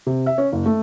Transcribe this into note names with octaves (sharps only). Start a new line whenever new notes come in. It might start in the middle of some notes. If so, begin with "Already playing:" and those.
C3
E5
C#4
F#1
A3